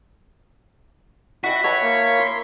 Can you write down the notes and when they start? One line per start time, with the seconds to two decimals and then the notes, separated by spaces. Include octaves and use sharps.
1.44 E4 F#4 E5 G5 B6
1.64 B4 C#5 E5 A5 B5
1.83 A#3
2.19 A#4 C6